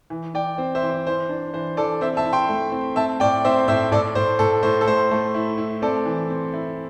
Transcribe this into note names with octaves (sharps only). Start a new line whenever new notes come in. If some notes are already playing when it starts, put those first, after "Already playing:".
E3
E3 D5 G5
C4 C5
C5 E5
E3
C5
E3 C5
D4
E3 C5
E3 A4 D5
C4 C5 E5
E5 A5
E4
G5 C6
A3
C4
C4 E5 A5
A2 D5 G5
C4 C5 E5
A2 C5 E5
A2 A4 D5
A2 C5
A2 A4
A2 C5
A4
A3 C5
A3
E4
E4
C4 A4 D5
E3
C4
E4